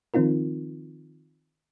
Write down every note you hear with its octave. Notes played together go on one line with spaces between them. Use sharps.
D#3 F3 C4 D#4 F4 A#4